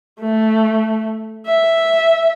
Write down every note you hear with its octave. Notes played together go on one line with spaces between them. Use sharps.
A3
E5